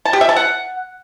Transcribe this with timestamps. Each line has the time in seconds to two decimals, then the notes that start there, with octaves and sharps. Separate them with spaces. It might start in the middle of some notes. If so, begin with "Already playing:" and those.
0.05 A5
0.13 G4
0.21 E5
0.29 A5
0.36 F#5